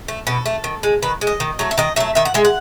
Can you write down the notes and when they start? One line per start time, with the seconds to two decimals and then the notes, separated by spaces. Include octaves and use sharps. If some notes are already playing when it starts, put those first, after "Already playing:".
0.08 A3
0.27 B2 A4
0.46 A3
0.64 D#3
0.83 G#3
1.03 D#3 B4
1.21 G#3
1.27 D#5
1.40 D#3
1.59 F#3 A3
1.71 E5
1.78 D#3 D#5
1.96 F#3 A3 E5
2.15 D#3 E5
2.25 F#5
2.34 G#3 E5
2.45 F#5